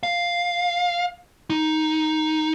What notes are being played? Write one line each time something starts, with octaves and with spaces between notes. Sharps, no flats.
F5
D#4